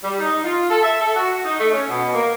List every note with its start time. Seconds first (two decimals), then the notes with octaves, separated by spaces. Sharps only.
0.04 G3
0.19 D#4
0.44 F4
0.70 A4
0.83 E5
1.01 A4
1.16 F#4
1.45 D#4
1.60 A3
1.73 C#4
1.89 B2
2.14 A#3